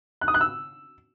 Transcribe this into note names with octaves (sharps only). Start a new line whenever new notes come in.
F#6
D#6
F#6
E6